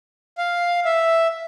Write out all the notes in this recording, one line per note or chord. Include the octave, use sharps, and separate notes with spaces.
F5
E5